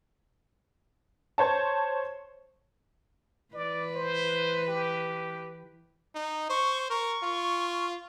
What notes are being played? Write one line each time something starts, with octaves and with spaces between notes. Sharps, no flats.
C5 C#5 A5
E3 B4 D5
C5
G4
D#4
C5 C#6
A#4 C#6
F4